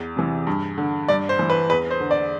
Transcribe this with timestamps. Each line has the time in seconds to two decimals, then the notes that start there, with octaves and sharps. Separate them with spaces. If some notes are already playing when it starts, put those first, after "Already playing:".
Already playing: E2
0.16 C3 E3
0.47 G2
0.78 D3
1.08 G2 D5
1.29 C5
1.39 E3
1.50 B4
1.69 E2 B4
1.90 C5
2.00 D3
2.11 D5